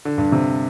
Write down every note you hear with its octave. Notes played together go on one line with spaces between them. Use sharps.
D3
G2
C3